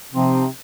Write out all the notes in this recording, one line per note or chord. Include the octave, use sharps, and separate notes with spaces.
C3 F3 C4 D#4